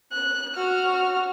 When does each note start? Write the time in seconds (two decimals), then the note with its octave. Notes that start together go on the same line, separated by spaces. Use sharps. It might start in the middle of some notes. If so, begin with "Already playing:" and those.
0.12 F#6
0.56 F#4 F6